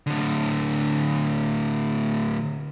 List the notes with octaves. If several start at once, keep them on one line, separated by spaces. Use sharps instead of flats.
A2 D3